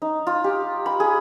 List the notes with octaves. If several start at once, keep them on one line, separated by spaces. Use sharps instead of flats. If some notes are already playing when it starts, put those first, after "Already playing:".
D#4
F4
G4
B5
G#4